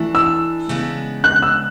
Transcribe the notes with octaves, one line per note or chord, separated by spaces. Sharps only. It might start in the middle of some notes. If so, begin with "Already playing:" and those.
Already playing: E3 A3 D4 A4
E6
C#3 G#3 B3 D4
F#6
E6